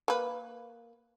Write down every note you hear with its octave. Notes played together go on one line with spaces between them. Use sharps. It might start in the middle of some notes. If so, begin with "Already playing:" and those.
A#3 B4